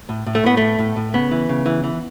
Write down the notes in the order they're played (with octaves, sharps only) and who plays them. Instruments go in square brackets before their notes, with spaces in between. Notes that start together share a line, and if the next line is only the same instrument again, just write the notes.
[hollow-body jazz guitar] A2
A2
A3
A2 B3
A2 A3
A2
A2
C#3 B3
E3
C#3
E3
E3